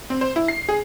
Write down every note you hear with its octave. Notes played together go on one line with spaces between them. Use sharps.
C4
C5
E4
C7
G#4